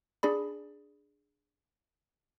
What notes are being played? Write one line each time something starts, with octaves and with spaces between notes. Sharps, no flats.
D4 G#4 D5 B5